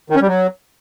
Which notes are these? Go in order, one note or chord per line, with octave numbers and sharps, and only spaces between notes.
D#3
C#4
G3
F#3